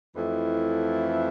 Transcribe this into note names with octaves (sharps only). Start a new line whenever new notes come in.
F2 E3 A3 E4